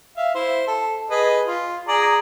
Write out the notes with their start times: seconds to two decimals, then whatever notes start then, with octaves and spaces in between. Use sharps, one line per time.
0.17 E5 F5
0.35 E4 C5
0.67 A4
1.10 G#4 B4 D#5
1.47 F4
1.88 G#4 D5 A#5